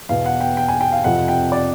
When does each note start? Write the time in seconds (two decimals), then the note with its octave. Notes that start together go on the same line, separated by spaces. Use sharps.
0.09 E2 B2 F5
0.26 F#5
0.40 G5
0.57 G5
0.68 G#5
0.81 G5
0.92 F5
1.04 F2 C3 F3 F#5
1.28 G5
1.52 D5